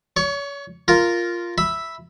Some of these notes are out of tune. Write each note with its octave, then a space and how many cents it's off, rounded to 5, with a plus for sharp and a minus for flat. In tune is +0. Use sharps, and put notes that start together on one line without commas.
C#5 +35 C#6 +0
F4 -5 A#4 +0
E5 +0 B5 +0